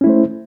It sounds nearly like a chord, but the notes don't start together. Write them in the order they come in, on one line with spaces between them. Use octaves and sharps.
C#4 E4 A3 C5